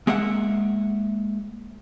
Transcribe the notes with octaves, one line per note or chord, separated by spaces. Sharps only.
G#3 A#3 E5 F#5